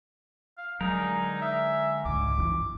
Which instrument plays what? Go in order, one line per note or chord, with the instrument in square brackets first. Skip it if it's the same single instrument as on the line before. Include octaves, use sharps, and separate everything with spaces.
[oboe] F5
[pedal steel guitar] D3 G#3 A#4 [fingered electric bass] F#3 [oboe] D#4
[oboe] E5
[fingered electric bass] C#2 G#2 [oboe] D6
[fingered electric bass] G1 C#3 E3